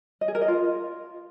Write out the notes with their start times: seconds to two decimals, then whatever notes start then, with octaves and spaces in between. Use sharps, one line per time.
0.21 D#5
0.28 G#4
0.35 A#4
0.41 D#5
0.48 F4